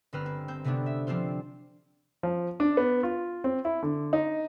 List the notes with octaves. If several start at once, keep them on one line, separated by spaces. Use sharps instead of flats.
G1 C4 B4 F6
C4
C4 G6
C3 A3 B3 C#4 D4
E5
F3 C4 D4 F4 C5
F3
D4
B3
F4
C4
E4
D3
D#4